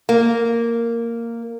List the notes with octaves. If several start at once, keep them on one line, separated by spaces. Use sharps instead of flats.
A#3